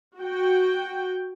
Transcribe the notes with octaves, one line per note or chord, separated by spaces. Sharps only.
F#4 G5